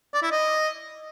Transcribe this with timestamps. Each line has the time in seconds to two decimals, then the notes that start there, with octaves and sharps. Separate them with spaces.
0.14 D5
0.23 E4
0.32 D#5